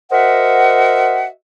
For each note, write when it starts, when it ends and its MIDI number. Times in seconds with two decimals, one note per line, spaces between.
0.12 1.27 66
0.12 1.27 70
0.12 1.27 72
0.12 1.27 75
0.12 1.27 76
0.12 1.27 78